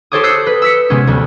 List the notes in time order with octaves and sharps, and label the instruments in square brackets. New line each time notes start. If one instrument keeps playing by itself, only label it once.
[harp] G4 A4 C5 C#5 D6 D#6
D#6 E6 F#6 G6 C7 C#7
B4
E6 B6 C#7
C3 G#3 B3 C#4
D2 G3